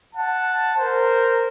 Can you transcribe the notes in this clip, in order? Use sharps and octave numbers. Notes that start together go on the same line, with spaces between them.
F#5 A5
A#4 C5